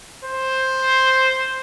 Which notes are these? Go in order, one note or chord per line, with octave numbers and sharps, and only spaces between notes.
C5